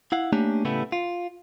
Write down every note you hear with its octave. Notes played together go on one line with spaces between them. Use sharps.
E4 F5 F#5
A3 A#3 C#4 D4 G4
A2 C#3 G3 A3 B3 E4
F4